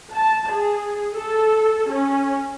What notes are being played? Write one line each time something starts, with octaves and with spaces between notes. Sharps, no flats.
A5
G#4
A4
C#4